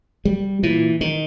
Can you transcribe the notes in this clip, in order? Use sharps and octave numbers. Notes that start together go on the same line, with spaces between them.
G3
A#2 E3
D#3